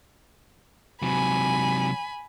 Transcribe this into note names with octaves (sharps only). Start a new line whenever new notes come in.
C3 F#3 G#5 B5